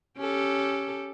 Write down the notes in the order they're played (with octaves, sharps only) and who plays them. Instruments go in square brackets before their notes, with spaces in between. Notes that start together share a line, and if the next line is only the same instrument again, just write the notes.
[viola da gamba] C#4 G4 A4